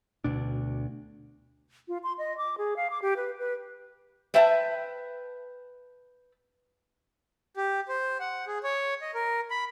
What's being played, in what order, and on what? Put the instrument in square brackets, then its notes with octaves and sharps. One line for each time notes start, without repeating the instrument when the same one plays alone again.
[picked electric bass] D2 B2 D4
[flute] F4
C6
D#5
D6
G#4
F5
D6
G4
B4
B4
[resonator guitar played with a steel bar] B4 C5 E5 G5 A5
[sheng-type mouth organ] G4
C5
F#5
G#4
C#5
D#5
A#4
B5